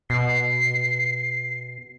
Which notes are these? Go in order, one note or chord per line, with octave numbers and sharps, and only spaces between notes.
B2 C7